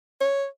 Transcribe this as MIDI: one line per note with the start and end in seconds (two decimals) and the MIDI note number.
0.21 0.46 73